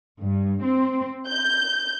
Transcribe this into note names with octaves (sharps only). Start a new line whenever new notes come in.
G2
C4
G6